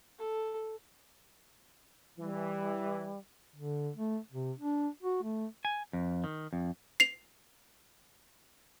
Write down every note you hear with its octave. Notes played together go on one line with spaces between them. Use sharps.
A4
E3 G3
D3
A3
C3
D4
F#4
A3
G#5
F2
D#3
F2
C7 F7